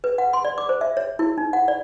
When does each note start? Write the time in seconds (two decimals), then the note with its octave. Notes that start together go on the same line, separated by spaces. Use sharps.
0.04 B4
0.18 F#5
0.33 C6
0.45 D5
0.58 D6
0.69 C5
0.81 E5
0.97 C#5
1.19 E4
1.38 D#4
1.53 F#5
1.68 D5